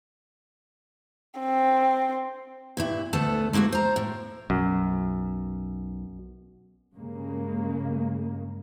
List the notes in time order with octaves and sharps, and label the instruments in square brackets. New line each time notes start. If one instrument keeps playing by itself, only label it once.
[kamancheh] C4
[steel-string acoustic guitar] G2 A#2 E4
D2 A3 B3 A4 A5
G#3 A#3 D#4 E4 F#4
C5 A#5
A2
[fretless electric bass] B1 [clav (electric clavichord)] F#2
[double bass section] G2 C#3 G#3 A#3